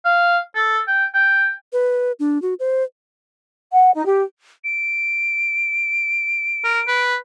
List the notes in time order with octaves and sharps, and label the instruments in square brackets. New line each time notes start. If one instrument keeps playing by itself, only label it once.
[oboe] F5
A4
G5
G5
[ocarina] B4
D4
F#4
C5
[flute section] F#5
D#4
G4
[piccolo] D7
[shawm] A#4
B4